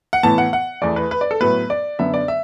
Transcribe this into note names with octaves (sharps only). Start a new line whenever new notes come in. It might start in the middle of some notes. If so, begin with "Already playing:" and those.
F#5
A2 E3 B3 A5
F#5
F#5
E2 E3 A3 D5
B4
B4
D5
A4
A2 F#3 B3 B4
D5
F#2 D3 B3 E5
D5
E5